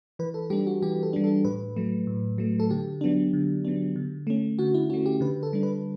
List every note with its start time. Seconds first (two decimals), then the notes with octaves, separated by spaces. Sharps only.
0.19 E3 B4
0.34 A4
0.50 G3 D4 G4
0.67 F#4
0.82 E3 G4
1.03 A4
1.13 G3 D4
1.24 A4
1.45 A2 B4
1.76 F#3 A3
2.07 A2
2.38 F#3 A3
2.60 A4
2.70 D3 G4
3.01 F#3 B3 D4
3.33 D3
3.65 F#3 B3 D4
3.96 D3
4.27 A3 C#4
4.59 D3 F#4
4.74 E4
4.90 A3 C#4 F#4
5.06 G4
5.21 D3 B4
5.43 A4
5.53 G3 D4
5.63 B4